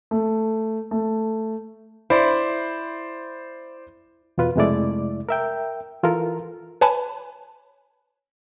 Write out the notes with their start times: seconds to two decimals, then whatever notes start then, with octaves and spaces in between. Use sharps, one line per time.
0.11 A3
0.91 A3
2.10 E4 C5 D5 C6
4.38 E2 B2 F4 B4
4.56 F2 C3 G#3 A3 E4 D5
5.29 A#4 E5 G5
6.03 E3 F4 A4 A#4
6.81 B4 C#5 G#5 A5 B5